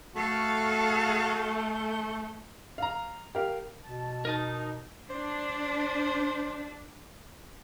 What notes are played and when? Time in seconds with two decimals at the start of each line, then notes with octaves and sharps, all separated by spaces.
0.16 A3 F#4 A4 F5
2.78 F5 A#5
3.35 G4 A#4 F5
3.83 B2 A5
4.25 D#4 A#4 D#5 A5
5.10 D4 C5